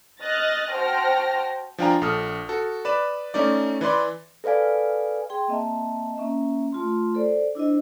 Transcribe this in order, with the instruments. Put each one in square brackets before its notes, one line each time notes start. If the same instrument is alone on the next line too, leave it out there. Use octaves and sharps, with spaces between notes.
[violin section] D#5 F6 F#6 A6 A#6
F#4 C5 G5 A5 F6 A#6
[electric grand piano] F3 D4 F4 G5 G#5 A#5
A#1 A4 D#6 F6
F#4 A4
B4 D5 E7
A3 C#4 D#4 D5
E3 B4 D5 C6
[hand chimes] A4 B4 D5 F5 G#5
[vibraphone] G#4 G5 C6
A#3 C4 D#5 E5 A5
A#3 C#4 E5
A3 F4 C6
A4 C5 D5
D4 E4 C5 D#5